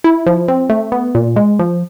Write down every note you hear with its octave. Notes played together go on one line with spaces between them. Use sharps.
E4
F3
C4
A3
B3
A#2
G#3
F3